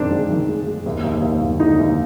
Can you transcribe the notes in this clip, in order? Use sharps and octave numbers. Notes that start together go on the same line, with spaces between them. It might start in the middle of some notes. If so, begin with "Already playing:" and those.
Already playing: D#3 G#3 C4 D4
G#3
D#3
G#3
G#3
D#2
D#2
D#2
D#2
D3 D#4
D#2